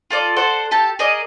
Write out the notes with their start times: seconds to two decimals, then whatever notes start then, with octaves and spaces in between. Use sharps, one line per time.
0.10 F4 A4 D5
0.36 A4 C5 D5 F#5
0.71 G4 A4 A5
0.99 G#4 A#4 D5 D#5